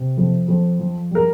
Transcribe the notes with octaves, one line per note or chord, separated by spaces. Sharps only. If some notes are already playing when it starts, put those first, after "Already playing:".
Already playing: C3
F2
F2
F3
G3 A#4